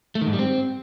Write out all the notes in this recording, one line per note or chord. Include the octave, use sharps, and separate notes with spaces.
A3
D#3
G#2
G3
C4